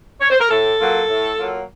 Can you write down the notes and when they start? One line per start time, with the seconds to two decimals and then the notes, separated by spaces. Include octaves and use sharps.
0.21 C#5
0.30 C5
0.40 A#4
0.49 A2 A4
0.79 F#3 A#3 F4
1.08 A2
1.38 F#3 A#3 F4